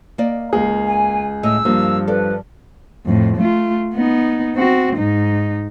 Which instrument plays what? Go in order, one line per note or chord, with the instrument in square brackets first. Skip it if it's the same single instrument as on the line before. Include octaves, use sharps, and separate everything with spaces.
[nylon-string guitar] A#3 D5 D#5
[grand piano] C#2 G#4 [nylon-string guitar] A#3
[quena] G#5
[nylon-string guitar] A2 D#5 [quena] E6
[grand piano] G2 F3 [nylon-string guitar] A#3
[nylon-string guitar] A4 D5 [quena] B4
[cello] F2 A2
A3 F4
B3 D#4
C4 F#4
G#2 D#4